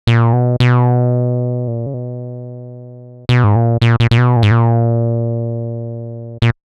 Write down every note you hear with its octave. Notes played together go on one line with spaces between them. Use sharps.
A#2
B2
B2
A#2
C#3
B2
B2
G#2
A#2
A#2
A#2
A#2
B2
A#2
G#2
A#2
A#2